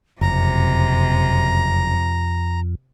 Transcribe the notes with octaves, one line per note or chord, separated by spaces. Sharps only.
F#1 F2 C3 A#5